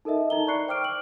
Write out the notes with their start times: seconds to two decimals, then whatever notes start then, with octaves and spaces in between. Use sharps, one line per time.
0.05 D#4 A4 A#4 D#5 E5
0.30 D#4 A#5 G7
0.47 D5 B5 C#6 F#6 C7 C#7
0.67 C5 G5 D6 F6 D7
0.83 E6 F#7